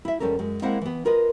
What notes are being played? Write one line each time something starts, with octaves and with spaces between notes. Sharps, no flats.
E4 E5
E2 G3 C#4 A4 A#4
F#2 G#3
G#3 A#3 C4 E4 F#5
E3 B3
F4 A#4 B4 D#5